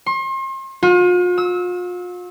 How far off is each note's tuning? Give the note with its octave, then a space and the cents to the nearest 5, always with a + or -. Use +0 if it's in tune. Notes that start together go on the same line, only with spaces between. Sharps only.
C6 +40
F4 +40
E6 -30